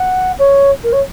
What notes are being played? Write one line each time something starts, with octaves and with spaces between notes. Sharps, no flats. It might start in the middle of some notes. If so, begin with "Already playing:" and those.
Already playing: F#5
C#5
A#4
C#5